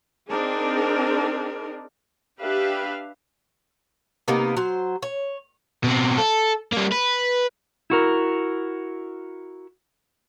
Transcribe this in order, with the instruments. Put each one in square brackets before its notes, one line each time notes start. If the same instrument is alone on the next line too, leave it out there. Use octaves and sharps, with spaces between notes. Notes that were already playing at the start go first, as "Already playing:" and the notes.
[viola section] C4 D4 D#4 G#4 A#4
D4 G4 B4 E5 F5
[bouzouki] C3 A#3 B3 D#4
F#3 C5
C#5
[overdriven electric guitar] B2 C4
A4
G3 A#3
B4
[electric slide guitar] E4 F#4 A#4